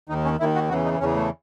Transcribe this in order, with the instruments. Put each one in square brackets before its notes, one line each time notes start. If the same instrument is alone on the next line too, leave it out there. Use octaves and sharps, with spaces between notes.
[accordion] D#2 D#3 D#4
C#4
D#2 D#3 E4
F#4
E2 C#3 E3 F#4
D#4
E2 C#3 E3 C#4
A3